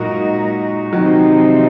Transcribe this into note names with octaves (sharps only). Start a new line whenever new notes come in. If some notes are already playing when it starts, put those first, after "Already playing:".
Already playing: A#2 F#3 G#3 D#4 F#4 A#4
C3 D#3 F3 F#3 C4 D#4